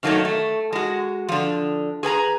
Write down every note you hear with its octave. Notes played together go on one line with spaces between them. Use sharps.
F#2 D#3 F#3 A3 A#3 D#4
A3
G#3 F#4
D3 F3
G#4 B4 G#5 A#5